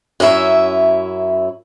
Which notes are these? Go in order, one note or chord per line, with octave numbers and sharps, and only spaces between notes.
F#2 C#4 E4 E5